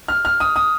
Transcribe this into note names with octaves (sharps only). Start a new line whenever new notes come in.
F6
F6
D#6
D#6